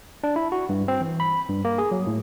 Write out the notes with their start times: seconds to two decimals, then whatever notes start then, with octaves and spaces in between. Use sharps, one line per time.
0.24 D4
0.36 E4
0.52 F#4
0.69 G2
0.88 C4
1.01 E3
1.20 B5
1.49 G2
1.65 A#3
1.78 G#4
1.91 F#3
2.07 A2